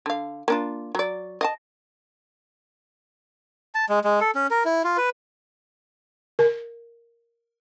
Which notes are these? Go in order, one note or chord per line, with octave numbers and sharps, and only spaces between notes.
D3 F5
A#3 D4 F4
F#3 D5
D#5 F5 A5
A5
G#3
G#3
A4
C#4
A#4
E4
F4
B4
A#4